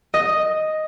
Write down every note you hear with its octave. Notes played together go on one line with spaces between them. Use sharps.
D#5